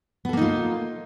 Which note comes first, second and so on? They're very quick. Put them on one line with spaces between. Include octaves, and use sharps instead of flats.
B3 A4 A#3 D#4 F4